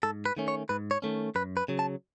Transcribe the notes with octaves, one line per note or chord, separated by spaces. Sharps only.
G#2 A4
B4
D#3 A3 C#4
C#5
G#2 B4
C#5
D#3 A3 C#4
F#2 B4
B4
C#3 F#3
A5